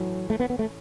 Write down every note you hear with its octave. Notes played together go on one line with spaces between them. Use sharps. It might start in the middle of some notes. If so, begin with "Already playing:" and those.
Already playing: A2 E3 F#3 A3 C#4
A3
B3
B3
A3